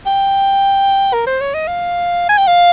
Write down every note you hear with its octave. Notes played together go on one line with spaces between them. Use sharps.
G5
A#4
C5
C#5
D#5
F5
G#5
G5
F5